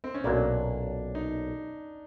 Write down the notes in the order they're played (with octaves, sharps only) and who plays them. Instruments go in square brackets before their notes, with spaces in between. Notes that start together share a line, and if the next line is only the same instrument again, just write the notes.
[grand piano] C4
C#4
[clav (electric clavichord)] B1 A#2 F#3 A#3 [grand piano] D4
[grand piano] D#4